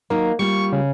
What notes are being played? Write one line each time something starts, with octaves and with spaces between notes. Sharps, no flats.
F#3 A#3 D#4
G3 A#3 F4 C#6
C#3